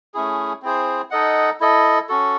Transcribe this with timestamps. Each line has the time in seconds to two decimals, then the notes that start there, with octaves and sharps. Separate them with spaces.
0.14 A3 C#4 E4 G#4
0.62 C4 E4 G#4 C5
1.10 D#4 A4 D#5 F#5
1.60 E4 A4 D#5
2.09 C#4 F#4 A4